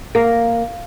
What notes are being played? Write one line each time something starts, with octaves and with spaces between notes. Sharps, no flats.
A#3